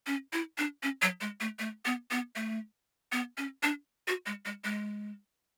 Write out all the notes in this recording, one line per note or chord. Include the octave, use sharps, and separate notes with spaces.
C#4
E4
D4
C#4
F#3
G#3
A3
A3
B3
B3
A3
B3
C#4
D4
F#4
G#3
G#3
G#3